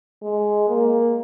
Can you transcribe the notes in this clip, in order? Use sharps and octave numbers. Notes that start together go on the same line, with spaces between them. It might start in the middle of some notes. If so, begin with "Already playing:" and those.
G#3
A#3